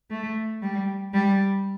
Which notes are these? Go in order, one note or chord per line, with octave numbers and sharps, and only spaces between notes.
A3
G3
G3